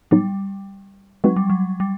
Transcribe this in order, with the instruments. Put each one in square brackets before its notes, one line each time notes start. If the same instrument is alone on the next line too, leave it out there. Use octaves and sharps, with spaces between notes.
[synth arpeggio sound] A2 F#3 B3 D#4 [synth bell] G3
[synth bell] F#3 [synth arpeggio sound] G#3 C4 D#4 F#4 B4
[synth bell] G3
F#3
G3